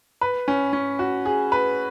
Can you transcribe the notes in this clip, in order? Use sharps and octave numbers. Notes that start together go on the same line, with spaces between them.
B4
C#4
C#4
F#4
G#4
B4